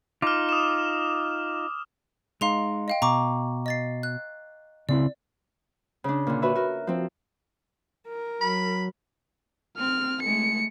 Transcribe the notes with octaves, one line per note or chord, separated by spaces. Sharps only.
D#4 F4 D6 F6
D#6 E7
G#3 D#4 F5 C6 F7
D#5 F5 G5
B2 A#5 C#6 D6
D#5 A6 C7
F#6
C#3 C4 E4 D5
C#3 D4
A#2 D3
F#4 B4 C#5 E5
F#4 A#4
F3 C4
A#4
F#3 B5
C4 F6
G#3 A3 C#7